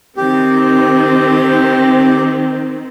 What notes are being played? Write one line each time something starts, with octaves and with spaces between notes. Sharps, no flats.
D#3 C4 G4